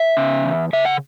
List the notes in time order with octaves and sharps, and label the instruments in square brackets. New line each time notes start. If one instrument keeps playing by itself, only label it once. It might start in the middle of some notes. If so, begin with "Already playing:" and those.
Already playing: [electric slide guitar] E5
C#3
E2
C#3 E5
F#5